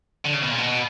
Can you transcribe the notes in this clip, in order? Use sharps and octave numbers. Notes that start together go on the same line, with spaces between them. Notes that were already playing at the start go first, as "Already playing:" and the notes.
D3
C#3
B2
A#2
B2